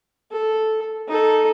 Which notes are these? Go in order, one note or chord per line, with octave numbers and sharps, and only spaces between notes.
A4
D#4 A4